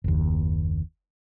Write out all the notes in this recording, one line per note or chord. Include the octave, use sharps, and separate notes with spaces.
F#1 D#2